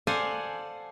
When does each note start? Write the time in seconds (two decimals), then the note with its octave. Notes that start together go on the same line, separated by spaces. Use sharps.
0.07 A4 C5 D5 F5 F#5 G#5